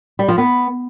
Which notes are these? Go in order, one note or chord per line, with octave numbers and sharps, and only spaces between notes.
G3
F3
B3